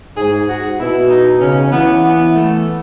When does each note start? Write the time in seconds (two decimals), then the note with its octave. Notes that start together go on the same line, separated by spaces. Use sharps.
0.17 G#2 G#4
0.48 F#4
0.79 B2 E4
1.09 D#4
1.41 C#3 C#4
1.72 E3 B3
2.04 B3
2.35 A3